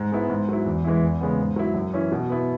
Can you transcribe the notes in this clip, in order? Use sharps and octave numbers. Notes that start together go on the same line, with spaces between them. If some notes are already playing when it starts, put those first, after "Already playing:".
Already playing: G#2
G#3 B3 E4
G#2
F#3 E4
E2
E3 G#3 E4
E2
C#3 G#3 B3
G#2
F#3 E4
F#2
E3 C#4 E4
B2
B3 E4